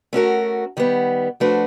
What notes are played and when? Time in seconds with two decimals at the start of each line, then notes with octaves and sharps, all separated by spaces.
0.13 A3 C#4 F#4 A#4
0.77 D#3 G3 B3
1.40 F3 A3 D4 F#4 B4